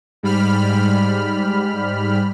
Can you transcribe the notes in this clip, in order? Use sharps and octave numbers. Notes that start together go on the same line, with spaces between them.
G#2 G3 B5 F6